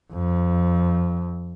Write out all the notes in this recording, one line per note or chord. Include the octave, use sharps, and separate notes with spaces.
F2